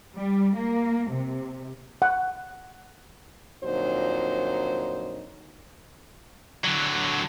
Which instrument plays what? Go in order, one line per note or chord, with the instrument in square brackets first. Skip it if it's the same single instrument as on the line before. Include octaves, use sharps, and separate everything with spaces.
[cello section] G3
A#3
C3
[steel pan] F#5
[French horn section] F2 A#2 D3 F#3 D#4 C5
[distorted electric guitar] D3 F#3